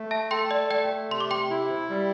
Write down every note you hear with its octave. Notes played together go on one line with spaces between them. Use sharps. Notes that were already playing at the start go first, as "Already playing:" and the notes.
Already playing: A3
E5 A5
A4 G5 C6
D5
A3 D5 G5
C3 C6
D6
G5 C6
E4
G3